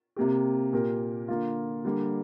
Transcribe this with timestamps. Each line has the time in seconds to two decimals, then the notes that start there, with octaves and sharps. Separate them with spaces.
0.16 C3 A#3 G4
0.73 A#2 A#3 G4 A#4
1.28 D3 A#3 F4
1.84 D3 G3 A#3